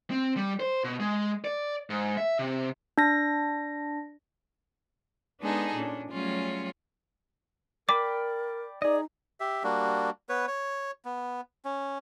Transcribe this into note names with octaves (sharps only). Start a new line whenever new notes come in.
C4
G3
C5
B2
G#3
D5
G#2
E5
C3
D4 A#6
G#3 B3 D4 D#4 G#4 A4
A#2 C#4 D4
F#3 G3 A3 C#4 F4 G#4
A#4 D5 G5 B5 D6
D#4 G#4 D5 D#5
G4 E5
G3 A#3 D4 F#4
B3 B4 C#5
C#5
B3
C#4